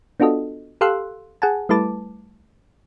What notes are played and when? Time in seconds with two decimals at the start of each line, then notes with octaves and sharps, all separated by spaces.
0.20 B3 D4 F4 F#4 A4 D#5
0.81 G4 A4 F5 C6 E6 F#6
1.42 G#4 F#5 G#5 A5
1.69 G3 A3 E4 B4 A5 D6